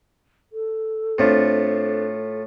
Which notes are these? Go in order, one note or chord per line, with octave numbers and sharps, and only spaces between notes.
A4
A2 A3 C4 D4 F4